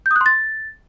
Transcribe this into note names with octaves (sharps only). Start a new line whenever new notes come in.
G6
D#6
F#6
C6
A6